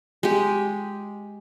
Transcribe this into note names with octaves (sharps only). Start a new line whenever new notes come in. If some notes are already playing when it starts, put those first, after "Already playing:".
G#3 G4